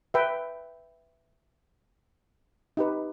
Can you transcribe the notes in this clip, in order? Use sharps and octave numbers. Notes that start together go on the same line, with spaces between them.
B4 E5 G5
D#4 G4 B4